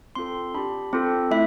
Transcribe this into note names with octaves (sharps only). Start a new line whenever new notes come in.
C4 F4 A4 C6
D4 G4 B5
C4 F4 A4
A3 E4 E5